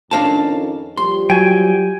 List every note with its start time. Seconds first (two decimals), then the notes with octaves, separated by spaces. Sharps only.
0.11 F2 D#3 C#4 D4 F5 A5
0.97 F3 G3 G4 C6
1.30 F#3 G5 G#5